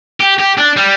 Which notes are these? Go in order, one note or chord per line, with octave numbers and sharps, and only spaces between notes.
G4
G4
D4
G3